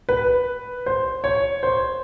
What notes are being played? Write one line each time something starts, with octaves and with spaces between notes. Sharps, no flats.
B4
C5
C#5
C5